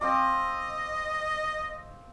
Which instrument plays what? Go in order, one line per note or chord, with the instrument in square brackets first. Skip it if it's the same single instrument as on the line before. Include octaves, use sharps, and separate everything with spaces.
[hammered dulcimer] C4 F5 D6 [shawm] D#5